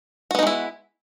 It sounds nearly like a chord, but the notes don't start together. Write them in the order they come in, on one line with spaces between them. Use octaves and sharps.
F#4 B3 D#4 G#3 E4